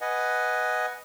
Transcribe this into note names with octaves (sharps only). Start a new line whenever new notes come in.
B4 D#5 F#5 G#5